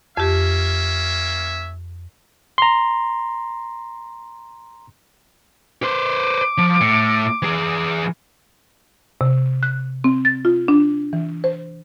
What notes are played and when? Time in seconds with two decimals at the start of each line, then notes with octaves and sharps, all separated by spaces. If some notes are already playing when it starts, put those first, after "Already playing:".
0.17 F2 A#3 C#4 G4 E5
2.58 A#5 C6
5.83 B4 C5 D6
6.58 F3
6.81 A2
7.42 E3 G#4
9.21 C3
9.63 F#6
10.04 C4
10.25 A6
10.45 F4
10.68 D4
11.13 E3
11.44 C5